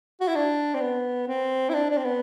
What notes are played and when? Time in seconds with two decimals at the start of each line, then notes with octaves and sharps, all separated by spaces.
0.20 F#4
0.28 E4
0.35 D4
0.74 C4
0.81 B3
1.28 C4
1.69 E4
1.74 D4
1.90 D4
1.97 C4
2.05 B3